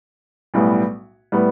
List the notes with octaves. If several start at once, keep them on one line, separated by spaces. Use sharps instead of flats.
B1 A2 G3 B3
A2 G3 B3